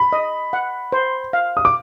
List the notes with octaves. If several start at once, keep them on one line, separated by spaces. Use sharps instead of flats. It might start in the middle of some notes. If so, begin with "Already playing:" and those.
Already playing: B5
D#5
F#5
C5
F5
D#6
D6